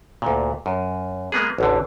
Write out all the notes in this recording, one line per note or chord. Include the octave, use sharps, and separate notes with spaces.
D2 A#2
F#2
G#3 A#3 B3 G#4
A1 E2 D3